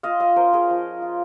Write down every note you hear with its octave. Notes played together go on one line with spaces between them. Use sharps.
F4 D#5 F5
D#5 F5
C#4 A#4 C5
G#4 A#4
F3
F4